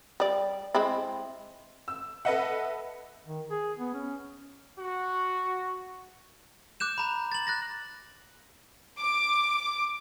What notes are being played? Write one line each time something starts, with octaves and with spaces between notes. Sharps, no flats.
G3 D5
G#3 C4 E4
E6
A4 B4 D#5 E5 F#5
D#3
G#4
B3
C#4
F#4
D6 F#6 G6 E7
A#5 B5
A6 F#7
F#6 A6 A#6
D6